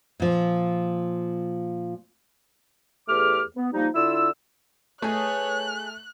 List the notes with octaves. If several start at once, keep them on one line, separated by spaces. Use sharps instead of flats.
A#2 F3
E2 A3 G4 G#4 D6 F6
B3
F3 G3 A#3 D#4
D3 E4 F4 E6
A3 G#4 B4 C#5 D#5 F#6